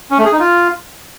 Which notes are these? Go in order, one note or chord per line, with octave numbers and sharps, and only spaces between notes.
C#4
A3
G#4
D#4
F4